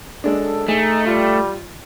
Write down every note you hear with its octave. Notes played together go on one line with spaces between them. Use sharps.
F#2 G#3 D4 A4
A3 D#4 G#4
G3 F4